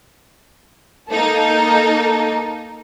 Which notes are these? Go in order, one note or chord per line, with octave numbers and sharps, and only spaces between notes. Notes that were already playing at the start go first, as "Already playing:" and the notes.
A#3 D#4 A4